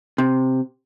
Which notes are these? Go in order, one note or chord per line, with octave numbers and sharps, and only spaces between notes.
C3